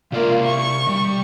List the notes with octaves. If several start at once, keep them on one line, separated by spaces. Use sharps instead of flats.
C3 A#3 F4 D5 E5
C#6
G3